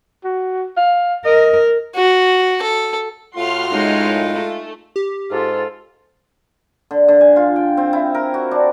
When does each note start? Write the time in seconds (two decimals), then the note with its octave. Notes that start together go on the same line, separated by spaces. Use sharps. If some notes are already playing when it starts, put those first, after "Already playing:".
0.24 F#4
0.77 F5
1.25 A#4 D#5
1.95 F#4
2.62 A4
3.36 A2 F4 F#4 C6 F6
3.70 F#2 A2 G#3 D#4
4.27 A3
4.96 G4
5.31 G#2 F4 A4
6.91 D3
7.08 D3
7.21 G#5
7.36 F4
7.56 G5
7.77 C4
7.93 E4
8.15 A#4
8.34 F#4
8.51 D4